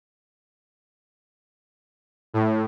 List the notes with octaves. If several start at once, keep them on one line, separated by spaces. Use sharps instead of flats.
A2